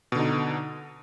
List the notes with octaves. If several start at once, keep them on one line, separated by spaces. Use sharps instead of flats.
B2 D3 D#4